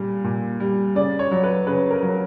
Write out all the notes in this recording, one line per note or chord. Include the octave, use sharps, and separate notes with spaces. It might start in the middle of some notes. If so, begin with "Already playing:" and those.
Already playing: A#2 G3
A#2
G3
C#3 D5
C#5
F#3
B4
C#3 B4
A#4
F#3